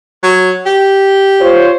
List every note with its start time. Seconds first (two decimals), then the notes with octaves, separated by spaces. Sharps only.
0.23 F#3
0.66 G4
1.41 F4 C5 C#5